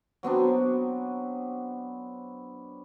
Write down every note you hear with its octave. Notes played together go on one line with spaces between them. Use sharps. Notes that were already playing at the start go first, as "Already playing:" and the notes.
F#3 B3 C4 D4